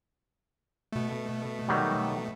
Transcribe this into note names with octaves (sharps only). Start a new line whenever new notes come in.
B2 A3
D#3 F#3 G3